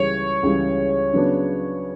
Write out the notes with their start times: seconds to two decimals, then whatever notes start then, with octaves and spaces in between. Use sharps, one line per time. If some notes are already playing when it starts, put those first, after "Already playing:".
Already playing: C#2 C#3 E3 G3 C#5
0.43 C#2 C#3 E3 G3
1.13 C#3 F#3 B3 D4